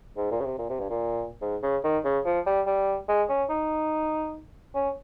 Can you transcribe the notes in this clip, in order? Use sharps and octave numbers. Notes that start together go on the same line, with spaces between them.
G#2
A#2
C#3
C3
A#2
C3
G2
A#2
G#2
C#3
D#3
C#3
F3
G3
G3
G#3
C#4
D#4
C#4